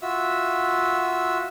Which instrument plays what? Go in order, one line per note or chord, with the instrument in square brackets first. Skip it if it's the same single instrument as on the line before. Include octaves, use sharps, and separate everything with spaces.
[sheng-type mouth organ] F4 F#4 E5 E6